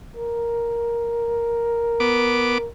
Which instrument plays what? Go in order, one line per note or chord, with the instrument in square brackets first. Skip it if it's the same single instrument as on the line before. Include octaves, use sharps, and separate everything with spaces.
[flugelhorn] A#4
[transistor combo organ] B3 D6